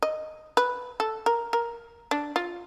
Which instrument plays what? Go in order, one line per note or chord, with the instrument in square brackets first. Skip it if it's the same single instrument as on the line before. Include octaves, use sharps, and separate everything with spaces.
[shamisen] D#5
B4
A4
A#4
A#4
D4
F4